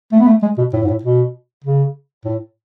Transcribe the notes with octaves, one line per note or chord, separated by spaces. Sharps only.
A3
B3
A3
G#3
B2
A2
G#2
A2
B2
C#3
A2